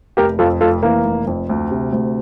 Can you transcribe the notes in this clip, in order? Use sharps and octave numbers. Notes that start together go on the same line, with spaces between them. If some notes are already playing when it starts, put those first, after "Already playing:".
F1 G4 A#4
F2 F4 A4
F1 F4 A4
E3 A#3
F1
F2
D2
C3
D2